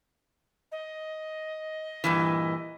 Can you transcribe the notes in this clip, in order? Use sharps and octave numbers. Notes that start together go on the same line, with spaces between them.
D#5
G2 A#2 E3